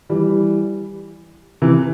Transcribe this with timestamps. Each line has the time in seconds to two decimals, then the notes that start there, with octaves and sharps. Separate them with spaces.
0.09 E3 G3
1.62 C3 E3